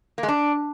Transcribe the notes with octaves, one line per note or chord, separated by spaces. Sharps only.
A#3
G#3
D4